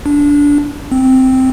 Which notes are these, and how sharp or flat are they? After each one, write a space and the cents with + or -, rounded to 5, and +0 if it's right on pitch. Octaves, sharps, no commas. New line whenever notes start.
D4 -20
C4 -5